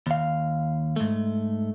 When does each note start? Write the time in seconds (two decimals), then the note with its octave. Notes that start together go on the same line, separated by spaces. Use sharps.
0.07 D#2 F5
0.96 G#2 A3